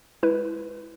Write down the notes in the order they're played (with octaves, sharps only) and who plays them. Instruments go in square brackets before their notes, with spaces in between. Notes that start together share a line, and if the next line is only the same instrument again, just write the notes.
[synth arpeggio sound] G#3 E4 B4